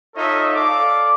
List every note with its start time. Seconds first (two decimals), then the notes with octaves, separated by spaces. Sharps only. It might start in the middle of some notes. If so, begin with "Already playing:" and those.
0.16 D#4 F4 A4 C#5 D#5 E5
0.54 A4 D5 F5 D6